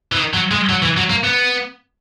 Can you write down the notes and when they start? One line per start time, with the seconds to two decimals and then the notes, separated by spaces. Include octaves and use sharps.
0.12 E3
0.17 D#3
0.34 F#3
0.51 G#3
0.70 F#3
0.83 E3
0.97 F#3
1.10 A#3
1.24 B3